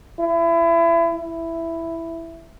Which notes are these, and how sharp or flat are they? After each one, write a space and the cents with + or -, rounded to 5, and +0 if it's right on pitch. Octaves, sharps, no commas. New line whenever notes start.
E4 +30
E4 +5